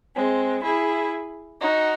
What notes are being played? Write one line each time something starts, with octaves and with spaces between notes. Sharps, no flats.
G#3 C4
E4 G#4
D#4 F#4